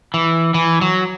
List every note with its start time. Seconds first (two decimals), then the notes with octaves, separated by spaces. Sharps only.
0.14 E3
0.54 E3
0.81 F#3